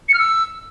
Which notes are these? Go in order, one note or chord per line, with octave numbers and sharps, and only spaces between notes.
C#7
F6
E6